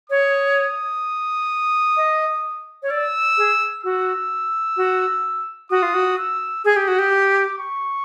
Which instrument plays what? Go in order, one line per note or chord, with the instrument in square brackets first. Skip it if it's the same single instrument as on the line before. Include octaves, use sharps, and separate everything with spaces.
[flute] C#5 [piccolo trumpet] D#6
[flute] D#5
C#5
[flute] D5 [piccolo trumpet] E6
[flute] G#4
[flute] F#4 [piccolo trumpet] E6
[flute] F#4
[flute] F#4 [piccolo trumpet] D#6
[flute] F4
F#4
[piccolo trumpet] E6
[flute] G#4 [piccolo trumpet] D#6
[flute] G4
F#4
G4
[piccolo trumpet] D6
C#6